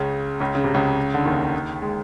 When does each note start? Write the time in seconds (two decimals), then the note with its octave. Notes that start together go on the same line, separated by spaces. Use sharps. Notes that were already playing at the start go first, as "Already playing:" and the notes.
Already playing: C#2 C#3
0.40 C#2 C#3
0.55 C#3
0.64 C3
0.74 C#2 C#3
1.14 D3
1.25 D#2 D#3
1.82 G#3